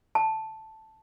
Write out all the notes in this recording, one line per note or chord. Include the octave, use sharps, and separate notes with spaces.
A5